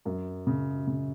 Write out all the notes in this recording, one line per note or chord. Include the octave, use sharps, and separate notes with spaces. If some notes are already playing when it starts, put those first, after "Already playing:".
F#2
C#3
C#3